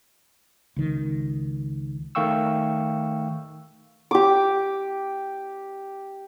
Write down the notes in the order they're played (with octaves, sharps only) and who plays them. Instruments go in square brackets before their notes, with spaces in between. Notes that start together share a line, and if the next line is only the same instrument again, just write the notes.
[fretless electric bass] C#2 D#3
[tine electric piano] D#3 A3 F5 G5 C#6 E6
[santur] G4 D6